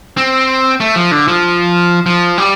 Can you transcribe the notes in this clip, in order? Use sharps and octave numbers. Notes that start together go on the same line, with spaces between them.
C4
A3
F3
D3
F3
F3
G3